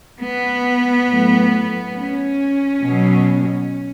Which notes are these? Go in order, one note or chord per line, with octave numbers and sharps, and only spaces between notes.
B3
A2 F#3
C#4
B2 F#3